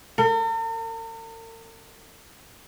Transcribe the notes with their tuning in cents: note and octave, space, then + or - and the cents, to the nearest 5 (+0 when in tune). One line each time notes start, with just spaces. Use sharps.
A#4 -45